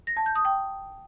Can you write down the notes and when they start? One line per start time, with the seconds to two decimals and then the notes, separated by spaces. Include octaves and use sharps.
0.07 A#6
0.17 A5
0.26 G6
0.36 D#6
0.45 G5